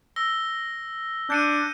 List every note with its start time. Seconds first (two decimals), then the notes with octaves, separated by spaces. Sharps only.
0.16 E6 A#6 G7
1.30 D4 G6 C#7 D#7